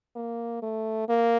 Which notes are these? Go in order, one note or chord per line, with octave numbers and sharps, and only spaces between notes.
A#3
A3
A#3